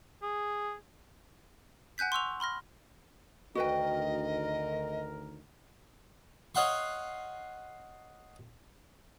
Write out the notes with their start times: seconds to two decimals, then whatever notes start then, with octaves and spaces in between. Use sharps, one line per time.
0.22 G#4
1.98 F#5 G#5 F#6 G6 B6
2.12 C6 C#6 E6 F7
2.40 B5 C6 F6 A#6
3.55 D2 D#3 F#4 A#4 B4 D#5 G5
6.55 C#5 D#5 F5 F#5 C6 C#6